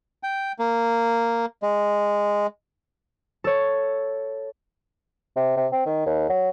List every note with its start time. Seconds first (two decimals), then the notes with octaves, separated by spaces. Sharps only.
0.23 G5
0.59 A#3
1.62 G#3
3.44 A4 C#5
5.36 C3
5.57 C3
5.72 C4
5.86 D#3
6.06 D#2
6.29 F#3